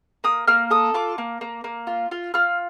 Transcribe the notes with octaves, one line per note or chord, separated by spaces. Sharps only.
A#3 D#6
A#3 F6
A4 D#6
F4 D6
A#3
A#3
A#3
F4
F4
F4 F6